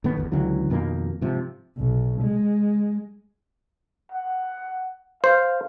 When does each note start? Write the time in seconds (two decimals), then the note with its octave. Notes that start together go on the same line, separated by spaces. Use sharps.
0.04 A2 D#3 B3
0.17 G#1 E2
0.32 C#2 D3 E3 F#3
0.70 F2 B2 D#3 A#3
1.21 G#2 C3 F3
1.78 B1
2.22 G#3
4.12 F#5
5.24 C5 F5